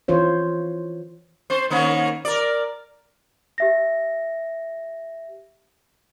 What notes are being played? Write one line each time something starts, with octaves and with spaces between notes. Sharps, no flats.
E3 F4 C5 C#5
C4 C5
D#3 A#3 C#4
A#4 D5
G4 E5 A#6